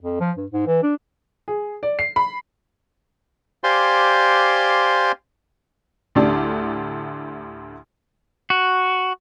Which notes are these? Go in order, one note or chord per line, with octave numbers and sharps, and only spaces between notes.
F2
F3
G2
G#2
E3
D4
G#4
D5
C7
B5
G4 C5 D5 F5 G#5 C6
D2 A2 D3 D4 G4 D5
F#4